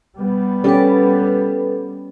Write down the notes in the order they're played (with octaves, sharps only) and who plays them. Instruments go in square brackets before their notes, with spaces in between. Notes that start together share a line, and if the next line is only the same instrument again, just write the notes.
[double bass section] G3 B3
[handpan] C#4 G4 D5 [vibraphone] A4 B4